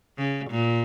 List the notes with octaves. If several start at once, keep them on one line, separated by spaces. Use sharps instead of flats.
C#3
A#2